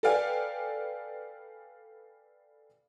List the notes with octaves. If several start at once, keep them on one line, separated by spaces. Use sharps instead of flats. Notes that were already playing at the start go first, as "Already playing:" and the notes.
A4 B4 D5 F5 G5 G#5